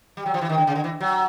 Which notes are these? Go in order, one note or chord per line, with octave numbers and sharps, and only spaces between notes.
G3
F#3
F3
E3
D#3
D3
C#3
D3
E3
F#3